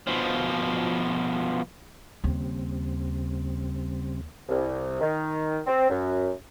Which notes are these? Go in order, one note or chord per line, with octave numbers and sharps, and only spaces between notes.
B2 F3
D#2 C#3 G3 C4
C2
D#3
C4
F#2